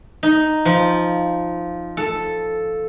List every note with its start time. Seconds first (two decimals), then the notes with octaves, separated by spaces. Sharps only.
0.23 D#4
0.65 F3
1.97 A4